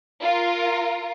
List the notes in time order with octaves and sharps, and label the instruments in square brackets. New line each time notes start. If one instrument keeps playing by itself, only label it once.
[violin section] F4 A#4